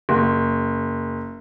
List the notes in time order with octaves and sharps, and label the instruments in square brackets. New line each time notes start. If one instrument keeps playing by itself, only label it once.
[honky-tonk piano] F#1